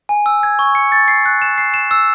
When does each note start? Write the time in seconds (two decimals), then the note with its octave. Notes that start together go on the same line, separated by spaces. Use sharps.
0.09 G#5
0.26 E6
0.43 G#6
0.59 C#6
0.75 C#7
0.92 A6
1.08 C7
1.26 F#6
1.42 E7
1.58 C7
1.74 E7
1.91 E6